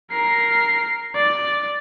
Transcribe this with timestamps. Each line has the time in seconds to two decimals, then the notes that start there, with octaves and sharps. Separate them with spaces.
0.12 A#4 C7
1.15 D5